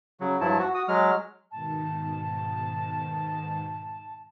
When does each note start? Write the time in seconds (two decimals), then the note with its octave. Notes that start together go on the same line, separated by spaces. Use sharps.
0.21 C#3 F#3
0.41 G2 F3 F#3 E4 A5
0.59 F#4
0.75 F#4 D#6
0.88 F#3 G#3 F6
1.51 G#2 B2 D#3 A5